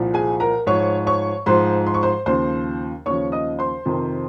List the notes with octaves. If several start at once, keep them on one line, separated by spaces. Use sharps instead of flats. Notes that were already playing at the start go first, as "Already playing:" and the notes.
Already playing: C2 A#2 F3
G#4 G#5
A#4 A#5
G#2 F3 C#5 C#6
C#5 C#6
G#2 F3 C5 C6
C6
C#6
C5 C6
D#2 C#3 F3 C5 C6
D#2 C#3 F3 C#5 C#6
D#5 D#6
C5 C6
F2 C3 D#3